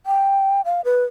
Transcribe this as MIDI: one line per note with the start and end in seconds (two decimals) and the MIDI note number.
0.06 0.61 79
0.65 0.81 77
0.85 1.04 71